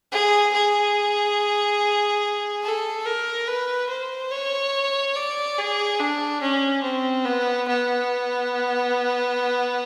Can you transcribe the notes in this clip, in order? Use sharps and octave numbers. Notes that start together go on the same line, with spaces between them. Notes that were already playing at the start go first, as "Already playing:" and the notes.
G#4
G#4
A4
A#4
B4
C5
C#5
D5
G#4
D4
C#4
C4
B3
B3